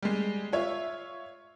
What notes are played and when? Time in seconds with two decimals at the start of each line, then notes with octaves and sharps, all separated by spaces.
0.03 G3 G#3
0.53 F4 C#5 E5